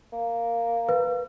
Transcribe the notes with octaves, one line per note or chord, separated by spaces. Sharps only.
A#3
B4